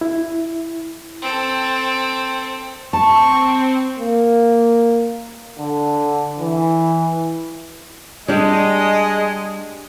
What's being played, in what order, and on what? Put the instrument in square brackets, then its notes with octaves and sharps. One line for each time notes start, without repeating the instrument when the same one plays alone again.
[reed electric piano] E4
[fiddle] C4 A4
[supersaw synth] C4 [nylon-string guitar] A5 [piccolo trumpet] C#6
[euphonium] A#3
D3
E3
[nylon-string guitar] G3 D4 G4 [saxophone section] G#3 [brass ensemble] D#5